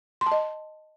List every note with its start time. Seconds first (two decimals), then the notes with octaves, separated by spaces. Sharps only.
0.21 C6
0.26 A5
0.32 D#5